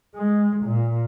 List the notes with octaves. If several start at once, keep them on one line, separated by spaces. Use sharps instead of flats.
G#3
A#2